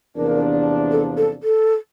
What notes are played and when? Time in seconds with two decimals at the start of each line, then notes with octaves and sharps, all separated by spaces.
0.15 E2 C3 F3 A#3 D4 A#4
0.91 A4
1.17 A4
1.43 A4